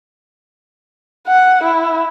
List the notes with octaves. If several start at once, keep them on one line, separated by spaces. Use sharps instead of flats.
F#5
E4